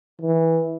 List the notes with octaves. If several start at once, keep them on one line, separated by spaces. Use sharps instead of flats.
E3